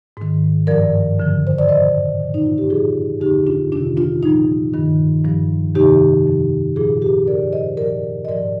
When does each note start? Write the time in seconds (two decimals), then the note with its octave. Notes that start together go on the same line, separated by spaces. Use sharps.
0.17 G#2 D#3
0.67 G2 F3 A#4 D5
1.19 F2 D3 F3
1.47 C5
1.58 D5
1.69 A#2 F3 C5 D#5
2.20 A#2 F3
2.34 D#4
2.46 F4
2.58 G4
2.70 A#2 F3 F4 G#4
3.21 F2 D3 F3 D#4 G4
3.47 D4 F4
3.72 F2 C3 D#3 D4 F4
3.97 D4 F4
4.23 A#2 F3 D#4
4.74 G2 D#3
5.24 G2 F3
5.75 F2 C3 D#3 D#4 G4
6.26 F2 C3 F3
6.76 A#2 F3 F4 G#4
7.02 G4 A#4
7.27 G#2 F3 A#4 D5
7.52 C5 D#5
7.77 A#2 F3 A#4 D5
8.25 D#5
8.28 G#2 F3 A#4 D5